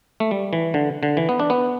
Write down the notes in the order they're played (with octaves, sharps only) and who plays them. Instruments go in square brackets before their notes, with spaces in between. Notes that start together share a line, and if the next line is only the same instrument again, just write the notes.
[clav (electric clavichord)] A3
G3
E3
D3
D3
E3
B3
D4
B3